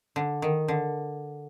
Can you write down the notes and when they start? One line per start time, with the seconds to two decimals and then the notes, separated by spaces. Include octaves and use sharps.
0.16 D3
0.42 D#3
0.68 D3